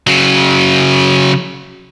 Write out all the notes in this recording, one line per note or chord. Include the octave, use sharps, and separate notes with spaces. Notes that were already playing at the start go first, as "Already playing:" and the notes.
C#3 F#3